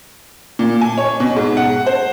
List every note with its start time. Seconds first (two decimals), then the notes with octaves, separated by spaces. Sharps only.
0.59 A#2
0.81 G#5
0.98 C#5
1.20 B2
1.36 G#2
1.57 F#5
1.86 C5